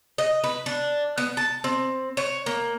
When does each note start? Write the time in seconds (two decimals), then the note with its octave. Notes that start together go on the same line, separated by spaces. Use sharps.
0.18 D#5
0.44 B4
0.66 D4
1.18 B3
1.37 A5
1.64 C4
2.17 C#5
2.46 A#3